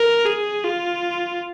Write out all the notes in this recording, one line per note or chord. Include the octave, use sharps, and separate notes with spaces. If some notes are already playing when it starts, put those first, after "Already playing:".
Already playing: A#4
G#4
F4